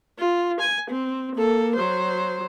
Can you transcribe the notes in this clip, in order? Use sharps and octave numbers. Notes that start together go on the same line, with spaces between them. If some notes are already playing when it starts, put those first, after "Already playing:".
F4
G#5
C4
A#3 A4
F#3 C5